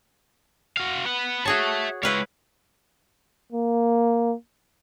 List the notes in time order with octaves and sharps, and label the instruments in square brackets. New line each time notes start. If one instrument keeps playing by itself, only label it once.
[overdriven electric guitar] F#4 F5
B4 F#5
[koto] F#4 G#4 C#5 [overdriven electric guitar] E5 A5
[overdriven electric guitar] G#3 C#5 [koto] E4 B4 F5
[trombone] A#3